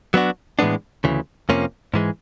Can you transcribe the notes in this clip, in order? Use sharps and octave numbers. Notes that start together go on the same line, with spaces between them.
F#3 B3 D4 F#4
A2 E3 G#3 B3 D4
D2 C#3 E3
F2 C3 F3 A#3 C#4
G#2 E3 G#3